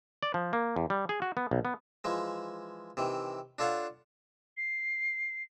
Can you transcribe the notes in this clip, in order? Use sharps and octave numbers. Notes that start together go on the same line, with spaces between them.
D5
F3
A#3
E2
G3
G#4
F#4
B3
B1
B3
E3 F3 G#3
C3 D#3 E3
D4 F4 A4 C#5 F5 F#5
C7